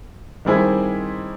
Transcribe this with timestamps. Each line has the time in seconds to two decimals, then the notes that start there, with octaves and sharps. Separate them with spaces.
0.45 D#3 G3 C4 E4 G#4